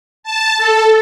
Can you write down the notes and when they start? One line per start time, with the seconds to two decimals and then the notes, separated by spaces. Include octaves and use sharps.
0.23 A5
0.57 A4